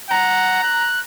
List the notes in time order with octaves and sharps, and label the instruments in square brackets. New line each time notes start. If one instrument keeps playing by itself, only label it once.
[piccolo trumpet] F#5 [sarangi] A#5
[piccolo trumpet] F#6